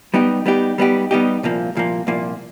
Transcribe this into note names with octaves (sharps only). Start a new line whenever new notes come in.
G3 B3 D#4 G4
G3 B3 D#4 G4
G3 B3 D#4 G4
G3 B3 D#4 G4
C2 A#2 F3 A#3
C2 A#2 F3 A#3
C2 A#2 F3 A#3